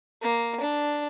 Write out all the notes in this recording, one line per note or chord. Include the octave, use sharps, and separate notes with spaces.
A#3
D4